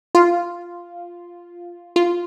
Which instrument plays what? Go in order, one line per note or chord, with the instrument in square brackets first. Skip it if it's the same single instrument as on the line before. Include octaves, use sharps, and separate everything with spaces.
[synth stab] F4
F4